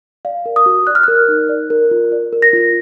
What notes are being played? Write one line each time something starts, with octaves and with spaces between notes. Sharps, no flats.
D5 F5
A#4
D#6
F#4
D5 F#6
F6
A#4 F#6
D#4
D5
A#4
F4
D5
A#4
A#6
F4